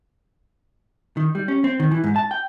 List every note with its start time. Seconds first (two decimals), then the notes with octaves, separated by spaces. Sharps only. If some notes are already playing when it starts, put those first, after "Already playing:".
1.17 D#3
1.35 G3
1.48 C#4
1.64 C4
1.80 D#3
1.91 E3
2.04 G#2
2.16 A5
2.31 G5